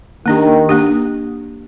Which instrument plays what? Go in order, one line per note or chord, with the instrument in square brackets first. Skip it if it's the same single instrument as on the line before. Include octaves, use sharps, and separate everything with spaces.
[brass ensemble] D#3 [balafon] A#3 D4 G4
[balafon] A#3 D4 G4